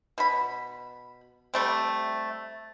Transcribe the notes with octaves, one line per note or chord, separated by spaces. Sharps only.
B2 B5
G3 A3 C4